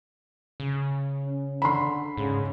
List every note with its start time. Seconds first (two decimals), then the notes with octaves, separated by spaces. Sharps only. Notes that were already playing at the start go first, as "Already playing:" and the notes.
0.60 C#3
1.26 C#4
1.62 D3 B5 C6
2.17 G#2 C#3